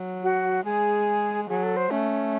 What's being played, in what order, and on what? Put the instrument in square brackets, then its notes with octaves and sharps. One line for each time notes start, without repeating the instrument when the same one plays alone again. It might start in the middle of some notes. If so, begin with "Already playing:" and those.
Already playing: [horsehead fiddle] F#3
[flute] F#4
[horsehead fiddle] G#3 [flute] G#4
[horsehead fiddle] F#3 [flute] G#4
[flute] A4
C5
[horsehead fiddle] A3 [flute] C#4